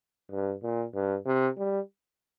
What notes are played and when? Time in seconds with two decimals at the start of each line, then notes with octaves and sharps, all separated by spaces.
0.32 G2
0.63 A#2
0.95 G2
1.26 C3
1.58 G3